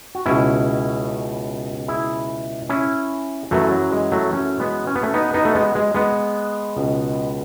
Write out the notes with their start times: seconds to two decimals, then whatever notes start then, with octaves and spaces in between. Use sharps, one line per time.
0.15 F#4
0.26 C#2 B2 C#4 E4
1.88 E4 G#4
2.69 C#4 E4
3.51 F#2 E3 F#3 A3
3.72 F#3
3.92 G#3
4.12 F#3 A3
4.33 A3 C#4
4.60 G#3 B3
4.87 C#4
4.95 B3
5.03 A3 C#4
5.14 B3 D#4
5.34 B3 D#4
5.45 A3
5.55 G#3 B3
5.75 G#3
5.94 G#3 B3
6.77 C#2 B2